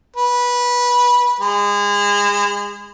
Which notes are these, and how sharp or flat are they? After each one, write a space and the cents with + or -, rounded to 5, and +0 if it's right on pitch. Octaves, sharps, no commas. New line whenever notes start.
B4 -15
G#3 -30